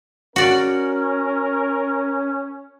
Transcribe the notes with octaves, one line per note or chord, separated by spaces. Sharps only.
C#4 F#4 A#4 D5